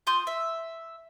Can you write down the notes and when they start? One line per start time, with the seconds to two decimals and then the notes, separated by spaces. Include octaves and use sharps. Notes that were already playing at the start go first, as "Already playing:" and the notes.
0.07 F4 C6 D#6 G6
0.27 E5